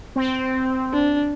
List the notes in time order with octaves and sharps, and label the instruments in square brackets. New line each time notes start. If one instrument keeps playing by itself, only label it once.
[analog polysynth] C4
[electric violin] D4